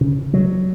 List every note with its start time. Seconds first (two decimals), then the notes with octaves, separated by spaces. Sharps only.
0.01 C#3
0.33 F#3